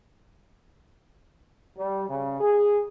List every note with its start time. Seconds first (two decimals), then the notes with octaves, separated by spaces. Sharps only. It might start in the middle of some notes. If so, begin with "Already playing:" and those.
1.77 G3
2.09 C#3
2.40 G#4